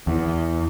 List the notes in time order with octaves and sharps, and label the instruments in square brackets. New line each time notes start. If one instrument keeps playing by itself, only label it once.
[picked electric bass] E2